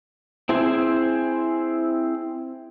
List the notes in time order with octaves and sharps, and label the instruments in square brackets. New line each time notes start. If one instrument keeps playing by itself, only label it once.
[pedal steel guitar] C4 E4 G#4 C5 G#5